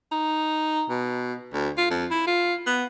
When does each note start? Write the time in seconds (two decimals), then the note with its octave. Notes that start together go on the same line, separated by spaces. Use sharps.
0.12 D#4
0.90 B2
1.53 D2
1.78 F4
1.90 F2
2.11 E4
2.27 F4
2.66 B3